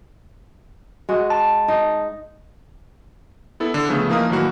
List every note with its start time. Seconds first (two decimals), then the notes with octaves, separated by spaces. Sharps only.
1.09 G#3 F#4
1.30 A5
1.68 D#4
3.60 B3 E4 A4
3.74 D3
3.89 C#3 F3 A3 B3
4.09 E3 F3 A#3 D#4 F5 D#6
4.29 A2 D#3 E3 F#3 A#3 F#4